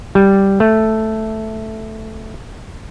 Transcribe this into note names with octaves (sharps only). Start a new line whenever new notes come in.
G3
A3